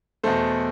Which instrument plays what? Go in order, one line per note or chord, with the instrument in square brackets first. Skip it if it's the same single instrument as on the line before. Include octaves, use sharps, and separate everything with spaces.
[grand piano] E2 B2 A3 A4 C5